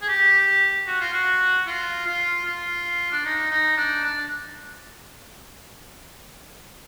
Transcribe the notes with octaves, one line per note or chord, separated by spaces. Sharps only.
G#4
G4
F#4
F4
F#4
F4
F4
F4
D4
D#4
D#4
D4
D4